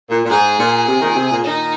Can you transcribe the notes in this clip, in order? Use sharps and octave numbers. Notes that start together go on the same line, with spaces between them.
A#2
A#2
G#2 G#4
A#2
C3
A#2 D#3
C3
A#2
A#2 D#3 D#4